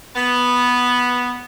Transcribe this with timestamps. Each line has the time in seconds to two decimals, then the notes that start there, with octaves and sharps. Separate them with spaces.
0.16 B3